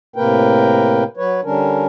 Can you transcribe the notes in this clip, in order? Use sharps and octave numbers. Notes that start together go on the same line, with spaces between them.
A2 C3 A#3 A#4 B4 G5
F#3 B4 C#5
D3 G3 C#4 D4 A#4